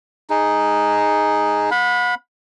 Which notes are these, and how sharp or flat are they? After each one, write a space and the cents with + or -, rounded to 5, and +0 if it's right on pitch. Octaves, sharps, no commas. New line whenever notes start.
D#4 +0 G#4 +0
F#5 -40 B5 +0